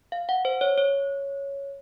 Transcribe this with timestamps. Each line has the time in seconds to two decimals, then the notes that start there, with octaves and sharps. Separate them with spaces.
0.12 F5
0.29 F#5
0.45 C5
0.61 C#5
0.78 C#5